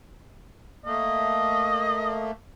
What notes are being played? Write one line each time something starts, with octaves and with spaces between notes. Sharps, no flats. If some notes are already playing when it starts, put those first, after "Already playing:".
A3 A#3 D#5